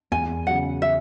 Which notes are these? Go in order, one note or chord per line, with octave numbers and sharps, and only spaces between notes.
E2 G#5
C#3 F#3 F#5
E5